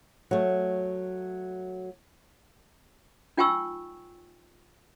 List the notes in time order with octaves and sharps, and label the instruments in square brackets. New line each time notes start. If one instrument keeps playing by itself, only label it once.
[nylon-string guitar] F#3 A3
[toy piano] D#4 F4 G5 G#5 C#6 E6